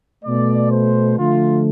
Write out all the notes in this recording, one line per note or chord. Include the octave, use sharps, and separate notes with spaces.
B2 A3 D5
C5
D3 F3 A3 F4